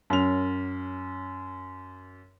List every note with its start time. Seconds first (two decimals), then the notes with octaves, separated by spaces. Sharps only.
0.10 F#2 F7